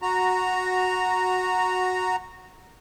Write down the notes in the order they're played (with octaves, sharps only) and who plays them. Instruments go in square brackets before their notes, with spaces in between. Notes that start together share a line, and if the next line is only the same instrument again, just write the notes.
[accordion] F#4 A#5